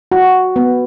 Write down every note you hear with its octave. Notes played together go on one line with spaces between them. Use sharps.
F#4
B3